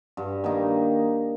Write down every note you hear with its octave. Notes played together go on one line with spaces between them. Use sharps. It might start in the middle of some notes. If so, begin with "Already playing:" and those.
G2
D#3 A#3 D#4